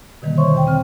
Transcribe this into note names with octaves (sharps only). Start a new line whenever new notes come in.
B2 D3 D#3 G3 A#3
C5 C#5 E5 C6 C#6
E2 G5
C4 F6